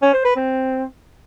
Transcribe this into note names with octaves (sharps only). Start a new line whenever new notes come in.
C#4
C5
B4
C4